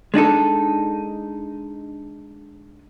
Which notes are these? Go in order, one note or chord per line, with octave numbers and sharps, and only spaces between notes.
G#3 D4 D#4 A4